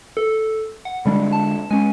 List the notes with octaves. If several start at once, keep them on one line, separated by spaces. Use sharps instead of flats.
A4
F#5
D3 G3 G#3 D4
A5
G#3 C#4 G#5